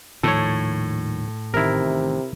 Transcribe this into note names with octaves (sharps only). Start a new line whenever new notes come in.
D#1 A2 D#3 F3 A4 C#5
A1 C3 D#3 E4 A#4